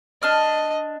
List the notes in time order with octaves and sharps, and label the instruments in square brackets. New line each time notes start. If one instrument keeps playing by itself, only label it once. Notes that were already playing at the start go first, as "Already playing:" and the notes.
[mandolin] D4 F6 [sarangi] D#5